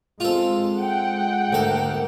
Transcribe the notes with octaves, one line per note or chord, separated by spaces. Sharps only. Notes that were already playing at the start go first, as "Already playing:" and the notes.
G#3 C4 F4 A4
G#3 F#5 G5
D2 G#2 A#3 A4